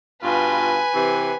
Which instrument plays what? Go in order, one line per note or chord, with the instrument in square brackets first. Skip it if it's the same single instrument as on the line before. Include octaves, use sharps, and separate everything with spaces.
[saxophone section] G2 B2 F4 [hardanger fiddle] B4 G#5
[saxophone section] C3 E3